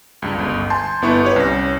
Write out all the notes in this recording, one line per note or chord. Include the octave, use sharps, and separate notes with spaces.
C#2 G2
G1 C#2
G#5 A5 C6 G6
G1 B3 E4 C#6 C#7
G4 B4 C#5
C2 C#4 A#6